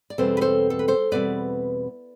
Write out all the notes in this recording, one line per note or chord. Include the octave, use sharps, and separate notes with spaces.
D5
E2 B2 G3 C4 A4 C5
B4
A4 C5
A4
B4
A4 C5
E2 B2 G3 C4 B4 D5